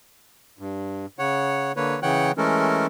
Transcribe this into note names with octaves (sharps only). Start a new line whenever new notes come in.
G2
C#3 C#5 F#5
D3 A#3 B4 C#5
C#3 E3 C#5 F#5 G5 F#6
E3 G#3 A3 C#4 A4 A#4